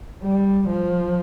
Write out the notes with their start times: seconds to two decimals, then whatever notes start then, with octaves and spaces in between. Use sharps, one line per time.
0.23 G3
0.69 F3